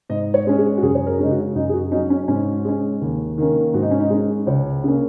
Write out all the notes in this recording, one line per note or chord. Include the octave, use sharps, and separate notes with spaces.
G#2 D#5
C#5
G#3 C#4
G#4
F#4
F#2 G#4
C#5
A#4
C#3 G#3 C#4 D#4
F#4
F#2 D#4
G#4
F#4
F#3 C#4 D#4
C#4
G#2 C#4
G#3 C#4
D#2
D#3 A#3 C#4
G#2 F#4
D#4
C#4
D#4
G#3 C#4
C#2 C#5
C#3 A#3 C#4